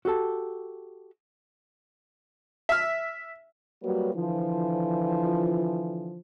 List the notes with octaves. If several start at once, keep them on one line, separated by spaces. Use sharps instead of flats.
F#4 G4 A4 A5
E5 F6
F#3 G3 A#3 F#4 B4 C#5
D3 E3 F3